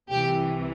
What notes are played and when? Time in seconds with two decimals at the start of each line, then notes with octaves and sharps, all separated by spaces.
0.11 C2 C3 E3 G4